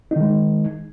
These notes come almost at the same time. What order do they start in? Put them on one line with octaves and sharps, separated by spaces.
D#4 D#3 G#3